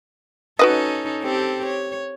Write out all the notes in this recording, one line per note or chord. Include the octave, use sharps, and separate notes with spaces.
C#4 D#4 F#4 A4 B4 D#5
C4 G4 A4
C#5